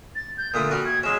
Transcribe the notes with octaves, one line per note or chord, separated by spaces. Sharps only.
A6
G6
A#2 D3 A3 D#6
G3 F#4 F6
G#6
F#3 G#3 C#4 E7